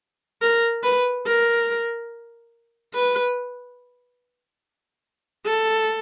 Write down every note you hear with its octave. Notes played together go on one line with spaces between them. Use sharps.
A#4
B4
A#4
B4
A4